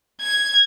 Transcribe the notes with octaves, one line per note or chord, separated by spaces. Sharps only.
G#6